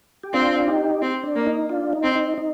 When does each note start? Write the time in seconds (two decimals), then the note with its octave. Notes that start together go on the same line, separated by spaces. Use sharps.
0.23 G4
0.33 C4 D4 F4
0.67 D#4 G4
1.02 C4
1.24 D4
1.36 A#3
1.46 D#4
1.69 D4 F4
1.93 D#4
2.03 C4
2.15 D#4
2.38 D#4